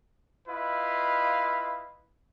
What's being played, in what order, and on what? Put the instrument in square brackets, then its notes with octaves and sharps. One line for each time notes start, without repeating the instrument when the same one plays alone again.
[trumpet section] E4 F4 B4 D#5 F5